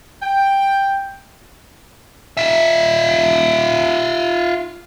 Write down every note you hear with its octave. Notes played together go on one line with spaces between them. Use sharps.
G5
F4 E5